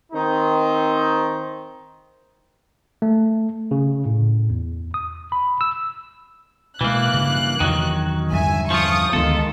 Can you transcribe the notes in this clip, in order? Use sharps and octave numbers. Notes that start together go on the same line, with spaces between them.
D#3 C4 D#4
A3
C#3
A2
E2
D#6
B5
E6
B2 E3 G#3 A#3 F#6
G2 C#3
E2 C3 D#3 F#3
E2 G2 D3 E5 G#5
F3 F4 C#6 D#6
D2 D#3 E3 G#3 B3 F4 A4